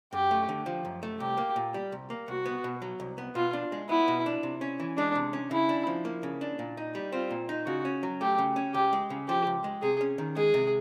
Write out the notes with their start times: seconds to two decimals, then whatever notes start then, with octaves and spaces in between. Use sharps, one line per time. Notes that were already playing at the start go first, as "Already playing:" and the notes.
0.13 F#2 G4
0.31 A3
0.49 D3
0.66 F3
0.85 F#2
1.03 A3
1.20 C2 G4
1.38 A#3
1.56 A#2
1.74 G3
1.92 C2
2.10 A#3
2.28 C2 F#4
2.46 B3
2.64 B2
2.82 F#3
3.00 C2
3.18 B3
3.35 B2 F4
3.53 D4
3.72 G#3
3.89 B3 E4
4.08 B2
4.26 D4
4.43 C3
4.61 C#4
4.80 E3
4.97 G#3 D4
5.15 C3
5.33 C#4
5.51 C#3 E4
5.69 D4
5.87 F3
6.05 A#3
6.23 C#3
6.41 D4
6.59 A#2
6.77 D#4
6.95 G3
7.12 C4 F4
7.31 A#2
7.49 D#4
7.66 C#3 F#4
7.85 C#4
8.03 F#3
8.21 A3 G4
8.38 C#3
8.56 C#4
8.74 C#2 G4
8.93 G#3
9.10 C#3
9.28 F3 G4
9.47 C#2
9.64 G#3
9.82 C3 G#4
10.01 C#4
10.18 D#3
10.37 G#3 G#4
10.54 C3